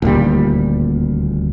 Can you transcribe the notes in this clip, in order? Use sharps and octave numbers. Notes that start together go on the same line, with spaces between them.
D#1 D2 A#2 G3